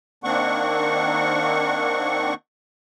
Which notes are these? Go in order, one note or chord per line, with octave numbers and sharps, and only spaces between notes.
D#3 A#3 C4 D4 F#5 C#6